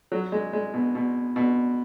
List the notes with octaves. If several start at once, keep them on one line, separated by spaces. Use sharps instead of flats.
F#3
G#3
G#3
B2
B2
B2